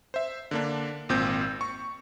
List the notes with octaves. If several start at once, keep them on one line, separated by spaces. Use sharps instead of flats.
C5 E5
D3 A#3 D4
G#1 A#2 C4 G6
C#6